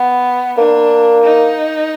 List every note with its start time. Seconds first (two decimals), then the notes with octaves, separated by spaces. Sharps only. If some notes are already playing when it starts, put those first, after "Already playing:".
Already playing: B3
0.58 A#3 D4
1.24 D#4